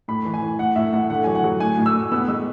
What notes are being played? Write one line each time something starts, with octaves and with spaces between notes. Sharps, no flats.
A2 B5
E3
G#5
E3
A2 F#5
A2 E5
A2 F#5
D3 F#5
F#3 G#5
F#5
F#3
A2 G#5
A2
E6
A2
B3 E6
G#3 E6